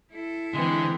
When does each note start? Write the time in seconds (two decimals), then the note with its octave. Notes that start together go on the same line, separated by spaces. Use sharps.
0.11 E4 A4
0.54 D3 E3 G#3 C4